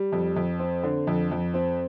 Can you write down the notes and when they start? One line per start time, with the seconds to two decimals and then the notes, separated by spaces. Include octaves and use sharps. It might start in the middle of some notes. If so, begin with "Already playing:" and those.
Already playing: G3
0.12 F2
0.36 F2
0.59 C4
0.83 D3
1.07 F2
1.31 F2
1.54 C4